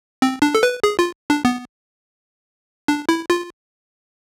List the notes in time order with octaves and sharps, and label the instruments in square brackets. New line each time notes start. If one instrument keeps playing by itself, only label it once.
[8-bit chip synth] C4
D4
A4
B4
G#4
F4
D4
B3
D4
E4
F4